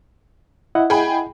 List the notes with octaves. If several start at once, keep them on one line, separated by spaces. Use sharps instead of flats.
E4 D#5 F#5
G#4 G5 B5